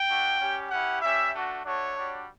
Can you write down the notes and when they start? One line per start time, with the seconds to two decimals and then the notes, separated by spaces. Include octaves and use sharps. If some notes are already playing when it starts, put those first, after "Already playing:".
Already playing: G5
0.08 A3 D4 F#4
0.39 G3 C#4 G4
0.70 C#4 E4 G4 F#5
1.01 G3 C#4 G4 E5
1.33 A3 D4 F#4
1.64 A3 D4 F#4 C#5
1.96 G3 D4 F#4